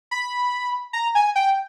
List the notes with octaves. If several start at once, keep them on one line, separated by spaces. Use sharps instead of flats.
B5
A#5
G#5
G5